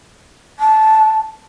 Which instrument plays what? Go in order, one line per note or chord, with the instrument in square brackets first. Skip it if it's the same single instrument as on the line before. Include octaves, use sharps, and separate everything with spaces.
[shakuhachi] A5